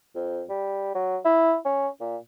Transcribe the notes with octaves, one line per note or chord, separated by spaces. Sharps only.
F2
G3
F#3
E4
C#4
A#2